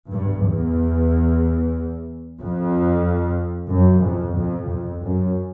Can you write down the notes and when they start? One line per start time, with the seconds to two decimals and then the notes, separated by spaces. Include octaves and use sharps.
0.10 G2
0.43 E2
2.39 F2
3.71 F#2
4.02 F2
4.36 F2
4.69 F2
5.02 F#2